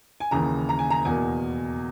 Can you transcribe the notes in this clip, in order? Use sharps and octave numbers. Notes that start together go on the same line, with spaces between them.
G#5
D#2 C#3 E3 A#5
A#5
G#5
A#5
E2 B2 A#3 G#5